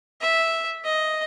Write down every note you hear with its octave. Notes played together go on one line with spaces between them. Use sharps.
E5
D#5